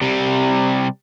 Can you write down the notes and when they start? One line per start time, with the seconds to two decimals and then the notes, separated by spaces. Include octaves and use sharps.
0.01 C3 G3